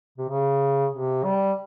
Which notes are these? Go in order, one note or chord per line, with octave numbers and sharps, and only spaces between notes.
C3
C#3
C3
G3